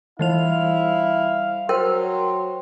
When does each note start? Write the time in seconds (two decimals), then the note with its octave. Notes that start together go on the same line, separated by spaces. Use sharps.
0.19 E3 G3 E4 F5 F7
1.69 F#3 A#4 C5 G5 C6